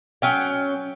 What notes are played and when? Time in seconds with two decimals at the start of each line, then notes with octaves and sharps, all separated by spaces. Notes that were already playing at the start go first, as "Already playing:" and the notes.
0.22 F#3 C#4 G5